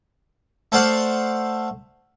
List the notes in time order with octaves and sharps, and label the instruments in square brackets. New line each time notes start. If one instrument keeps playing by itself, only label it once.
[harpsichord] A3 A4 C5 D5 F5 F#5